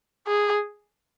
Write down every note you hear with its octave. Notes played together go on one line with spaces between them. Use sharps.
G#4